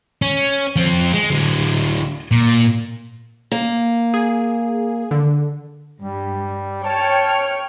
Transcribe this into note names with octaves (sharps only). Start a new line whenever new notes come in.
C#4
F3 C4
G#3
D3 F#3
A#2
A#3
G#4
D3
G2 G3
C#5 G5 A5 F6